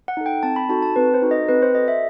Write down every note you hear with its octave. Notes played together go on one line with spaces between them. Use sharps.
F#5
D#4 A4
G5
C4 A5
B5
D#4 F#4 A4 A5
A5
C4 B4
C5
D#4 F#4 A4
D#5
C4 B4
C5
F#4 A4 D#5
E5